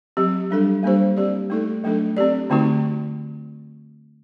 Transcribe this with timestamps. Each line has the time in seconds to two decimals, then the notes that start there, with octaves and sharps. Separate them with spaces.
0.17 F#3 C4 G4
0.51 G3 D4 A4
0.83 G3 A#3 D4 G4 C5
1.17 C4 G4 D5
1.50 A3 D#4 A4
1.84 F#3 A3 D4 A4
2.17 C4 G4 D5
2.50 D3 A3 C4 D#4 F#4